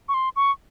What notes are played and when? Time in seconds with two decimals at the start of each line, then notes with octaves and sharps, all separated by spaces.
0.09 C#6
0.14 C6
0.36 C#6